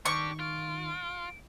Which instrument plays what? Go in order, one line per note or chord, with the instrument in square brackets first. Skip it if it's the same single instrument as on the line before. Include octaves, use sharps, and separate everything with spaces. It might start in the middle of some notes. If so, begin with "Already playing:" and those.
[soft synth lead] D#3 [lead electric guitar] D4 G4 [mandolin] C#6 [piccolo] D6
[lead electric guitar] F4 [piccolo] D7